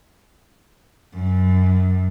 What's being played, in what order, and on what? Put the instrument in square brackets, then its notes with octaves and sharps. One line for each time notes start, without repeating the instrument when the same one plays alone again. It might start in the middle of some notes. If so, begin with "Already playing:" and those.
[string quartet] F#2